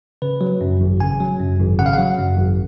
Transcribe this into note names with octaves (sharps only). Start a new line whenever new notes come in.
C#3 B4
F#3
F#2
G#1
C#3 G#5
F#3
F#2
G#1
C#3 F#5
F5
F#3 F#5
F#2
G#1